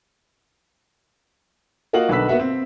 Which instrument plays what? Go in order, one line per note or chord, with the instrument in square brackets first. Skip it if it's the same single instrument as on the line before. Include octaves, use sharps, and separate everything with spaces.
[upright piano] A#3 F4 F#4 D#5 F5 F#7
B1 D3 B4 E6 B6
A#3 B3 F#4 E5 F#5
C4